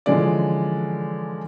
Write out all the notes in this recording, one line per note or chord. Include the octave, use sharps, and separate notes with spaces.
D3 E3 F3 G#3 C#4 D5